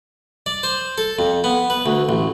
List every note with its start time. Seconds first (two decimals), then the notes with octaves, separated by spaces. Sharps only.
0.46 D5
0.63 C5
0.98 A4
1.19 F2
1.44 B3
1.70 B4
1.86 D2
2.09 A1